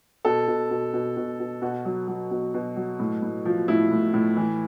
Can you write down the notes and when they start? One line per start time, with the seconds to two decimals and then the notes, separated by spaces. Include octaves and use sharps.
0.25 B2 A4
0.48 B2
0.71 B2
0.93 B2
1.17 B2
1.40 B2
1.62 B2 F#4
1.85 F#3
2.08 F#3
2.31 B2
2.54 B2
2.76 F#3
2.99 A2
3.22 A2
3.45 F3
3.68 A2 E4
3.91 A2
4.14 A2
4.36 E3